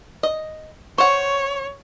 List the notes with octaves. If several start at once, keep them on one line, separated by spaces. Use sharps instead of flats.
D#5
C5 C#5 F#5 C#6